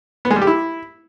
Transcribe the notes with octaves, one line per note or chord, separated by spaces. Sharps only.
B3
G#3
G3
G4
E4